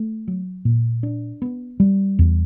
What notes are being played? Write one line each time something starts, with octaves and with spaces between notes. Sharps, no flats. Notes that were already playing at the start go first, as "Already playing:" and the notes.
Already playing: A3
F#3
A#2
D4
B3
G3
E2